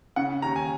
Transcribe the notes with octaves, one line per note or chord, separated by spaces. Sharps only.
C#3 F#5
D#2 A#5
G#5